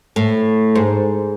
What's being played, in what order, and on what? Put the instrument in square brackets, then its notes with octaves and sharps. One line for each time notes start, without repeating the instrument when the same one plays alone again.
[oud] A2
G#2